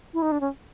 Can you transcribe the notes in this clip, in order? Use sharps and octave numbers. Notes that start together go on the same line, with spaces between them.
E4
D#4
D4
C#4